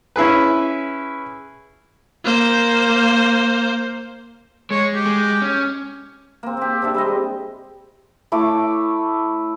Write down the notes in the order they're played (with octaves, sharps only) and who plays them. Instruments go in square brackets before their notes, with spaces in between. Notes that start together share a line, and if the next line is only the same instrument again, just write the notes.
[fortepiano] C#4 E4 G#4 B4
[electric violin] A#3 C5
[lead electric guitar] G#3 [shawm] C#5
[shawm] G4
[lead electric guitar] G#3
C#4
[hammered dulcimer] A#3 C4
C4 G4
C3 D4 A4 E5
G3 G#3 G#4 D#5
[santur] A3 E4 C#5 D6